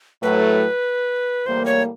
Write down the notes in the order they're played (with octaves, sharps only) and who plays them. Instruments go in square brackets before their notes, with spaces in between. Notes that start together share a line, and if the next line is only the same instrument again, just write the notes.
[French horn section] A2 F#3 A3 [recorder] B4
[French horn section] A2 E3 G3 A#3 [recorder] C5
[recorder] C#5